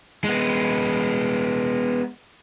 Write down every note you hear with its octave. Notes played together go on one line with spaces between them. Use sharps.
G#3 B3